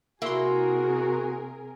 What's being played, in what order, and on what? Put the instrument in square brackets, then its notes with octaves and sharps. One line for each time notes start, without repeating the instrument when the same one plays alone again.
[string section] C3 G#4 A#4 [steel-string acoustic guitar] A#3 [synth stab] E4 C6 [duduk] F#4